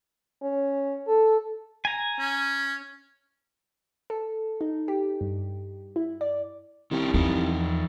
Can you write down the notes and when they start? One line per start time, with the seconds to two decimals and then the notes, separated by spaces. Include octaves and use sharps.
0.42 C#4
1.08 A4
1.85 G#5 A#5
2.19 C#4
4.10 A4
4.61 D#4
4.88 G4
5.21 G2
5.96 E4
6.21 D5
6.91 C2 D#3 C#4
7.14 E2 F3 D#4